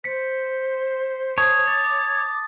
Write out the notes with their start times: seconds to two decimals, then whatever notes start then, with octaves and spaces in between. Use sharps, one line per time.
0.04 C5 B6 C#7
1.38 C#5 A5 D#6
1.68 D6 A6